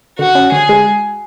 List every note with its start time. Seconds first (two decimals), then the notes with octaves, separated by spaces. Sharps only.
0.19 D3 F#4
0.35 C#4
0.52 D3 G#4
0.69 G#3